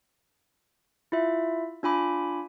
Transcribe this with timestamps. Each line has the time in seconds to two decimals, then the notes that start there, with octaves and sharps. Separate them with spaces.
1.12 E4 F4 E5
1.83 D4 F4 G#5 B5 D6